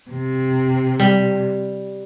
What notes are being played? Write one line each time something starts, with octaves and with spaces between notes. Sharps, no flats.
C3
G3